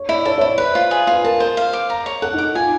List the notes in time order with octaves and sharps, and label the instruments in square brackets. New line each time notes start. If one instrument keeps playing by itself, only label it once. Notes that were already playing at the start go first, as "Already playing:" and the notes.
Already playing: [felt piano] C#5
[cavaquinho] E4 [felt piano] D5
[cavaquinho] A4 [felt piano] C#5
[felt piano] C#5
[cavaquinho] E4 [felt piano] C5
[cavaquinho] B4
F4
G#4
[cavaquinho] F4 [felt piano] B4
[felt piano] A#4 [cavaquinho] A5
[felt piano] A#4 [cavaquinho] C5
[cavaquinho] F5
D6
A#5
C#5
[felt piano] A4 [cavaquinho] F#5
[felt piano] D#4
[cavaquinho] D6
[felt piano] F4 [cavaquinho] G#5